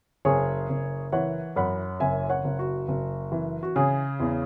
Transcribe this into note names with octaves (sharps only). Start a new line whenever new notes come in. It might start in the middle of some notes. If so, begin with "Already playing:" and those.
F#1 G#4 C#5
F#1
E3 C#5 F#5
F#2 F#5 B5
F#1 E5 G#5
C#5 F#5
F#1
F#4
F#1
E3
F#4
C#3 G#4
E2